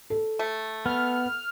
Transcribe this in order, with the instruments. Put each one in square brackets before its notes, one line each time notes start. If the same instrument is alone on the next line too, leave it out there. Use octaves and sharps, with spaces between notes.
[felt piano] A4
[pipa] A3
[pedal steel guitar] B3 [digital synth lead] F6